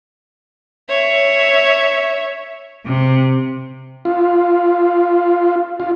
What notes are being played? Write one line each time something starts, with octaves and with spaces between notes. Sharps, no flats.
C#5 E5
C3
F4
F4